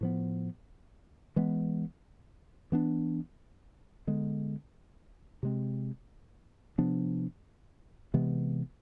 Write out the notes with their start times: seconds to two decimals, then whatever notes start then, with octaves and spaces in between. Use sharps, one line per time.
0.01 A2 F3 B3
1.36 E3 G#3 B3
2.72 E3 B3 D4
4.07 D3 G#3 B3
5.43 C3 G#3 C4
6.78 C3 F3 B3 D4
8.14 C3 E3 G#3 B3